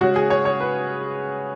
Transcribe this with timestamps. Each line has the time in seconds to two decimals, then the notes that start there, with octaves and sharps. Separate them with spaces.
0.01 C#3 G#3 C#4 F#4
0.16 G#4
0.30 C#5
0.45 C#5
0.60 B4